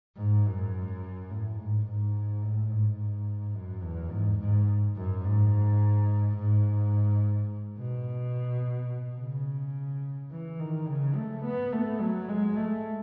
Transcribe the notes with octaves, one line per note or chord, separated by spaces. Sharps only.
G#2
F#2
A2
G#2
G#2
A2
G#2
F#2
E2
G#2
G#2
F#2
G#2
G#2
B2
C#3
E3
D#3
C#3
A3
B3
A3
F#3
G#3
A3